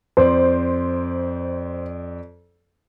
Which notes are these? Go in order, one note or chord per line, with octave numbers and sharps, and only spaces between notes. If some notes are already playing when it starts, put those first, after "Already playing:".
F2 C5 D5